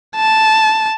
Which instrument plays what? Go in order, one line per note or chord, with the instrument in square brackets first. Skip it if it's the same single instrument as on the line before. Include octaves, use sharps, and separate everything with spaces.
[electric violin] A5